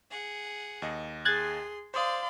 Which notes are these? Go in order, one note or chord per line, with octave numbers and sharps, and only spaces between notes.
G#4 F#5
D#2 D#5
G#4 C6 F#6 G#6 A6
C5 D5 F5 C6 D#6